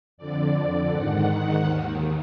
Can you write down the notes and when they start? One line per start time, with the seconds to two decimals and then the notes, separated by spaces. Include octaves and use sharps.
0.18 F2 D3 D5
0.90 G#2 D#3 F#5
1.63 D#2 D#3